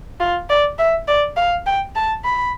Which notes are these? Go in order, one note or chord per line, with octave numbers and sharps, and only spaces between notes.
F4
D5
E5
D5
F5
G5
A5
B5